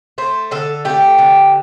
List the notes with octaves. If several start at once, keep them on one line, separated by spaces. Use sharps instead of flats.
A3 C5
D3 A4
A3 G4
D3